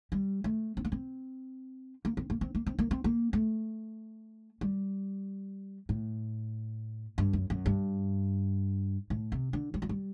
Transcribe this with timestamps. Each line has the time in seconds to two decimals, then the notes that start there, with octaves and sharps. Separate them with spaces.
0.12 G3
0.44 A3
0.77 C4
0.85 A#3
0.92 C4
2.05 A#3
2.17 C4
2.30 A#3
2.41 C4
2.55 A#3
2.67 C4
2.79 A#3
2.91 C4
3.04 A#3
3.33 A3
4.61 G3
5.89 A2
7.18 G2
7.33 F#2
7.50 F#2
7.66 G2
9.10 A2
9.32 C3
9.53 D3
9.74 G3
9.82 F#3
9.89 G3